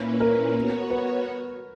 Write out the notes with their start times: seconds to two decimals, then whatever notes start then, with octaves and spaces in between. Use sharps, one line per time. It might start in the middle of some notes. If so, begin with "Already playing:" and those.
Already playing: A#2 A#3 C#4 E4 B4
0.20 A#4
0.55 B3 F#4 C#5
0.90 B4